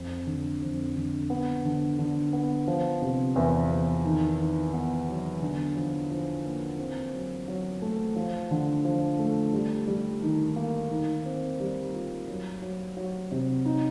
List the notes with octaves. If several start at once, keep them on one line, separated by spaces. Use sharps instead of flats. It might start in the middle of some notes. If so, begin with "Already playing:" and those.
Already playing: F2
D3
F2
D3
B3
D3
D3
B3
F3
C3
E2
E2
D#3
D#3
B3
F#3
D3
F3
F3
A#3
C4
F#3
F#3
A3
F3
D3
F3
A3
G3
G3
D#3
A#3
D#3
C4
G3
F4
F#3
F#3
F#3
C3
D#4